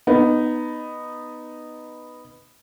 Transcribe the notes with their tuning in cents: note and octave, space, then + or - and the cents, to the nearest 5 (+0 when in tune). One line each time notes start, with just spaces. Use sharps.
B3 +0 D#4 -10